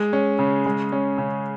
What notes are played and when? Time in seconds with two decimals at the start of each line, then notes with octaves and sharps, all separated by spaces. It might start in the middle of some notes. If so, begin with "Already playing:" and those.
Already playing: G#3
0.13 C#4
0.39 C#3
0.66 G#3
0.92 C#4
1.18 C#3